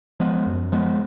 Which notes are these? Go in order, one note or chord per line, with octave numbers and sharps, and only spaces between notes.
F3 G#3 B3
F#2
F3 G#3 B3